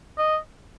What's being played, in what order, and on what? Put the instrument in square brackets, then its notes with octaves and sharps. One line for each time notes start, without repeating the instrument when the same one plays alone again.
[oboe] D#5